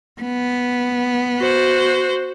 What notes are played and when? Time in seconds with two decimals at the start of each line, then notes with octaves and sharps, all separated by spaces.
0.21 B3
1.38 F#4 C5